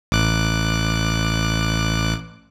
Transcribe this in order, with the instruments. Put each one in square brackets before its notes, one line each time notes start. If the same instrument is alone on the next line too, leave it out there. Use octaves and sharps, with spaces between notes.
[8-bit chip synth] A1 D6 F#6